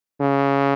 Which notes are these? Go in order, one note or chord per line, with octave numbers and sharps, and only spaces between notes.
C#3